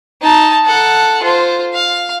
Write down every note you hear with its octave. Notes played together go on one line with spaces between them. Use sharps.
D#4 A5
A4 F#5
F4 C5
F5